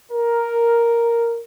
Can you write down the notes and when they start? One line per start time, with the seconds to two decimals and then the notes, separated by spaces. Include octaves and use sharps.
0.12 A#4